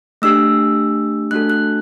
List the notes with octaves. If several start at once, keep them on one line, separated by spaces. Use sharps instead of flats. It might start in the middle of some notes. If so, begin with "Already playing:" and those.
A3 D4 G4 E6
A3 D4 F#4 A4 F#6
F#6